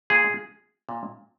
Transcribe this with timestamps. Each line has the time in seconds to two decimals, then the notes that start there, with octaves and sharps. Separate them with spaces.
0.10 A#2 G#4
0.89 A#2